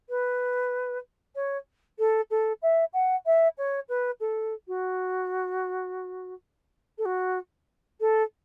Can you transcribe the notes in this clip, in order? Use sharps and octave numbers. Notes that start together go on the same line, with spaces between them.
B4
C#5
A4
A4
E5
F#5
E5
C#5
B4
A4
F#4
A4
F#4
A4